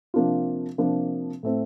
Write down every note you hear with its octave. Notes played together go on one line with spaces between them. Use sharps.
C3 F3 A#3 D4 F4
C3 F3 A#3 D4 F4
A2 A3 C4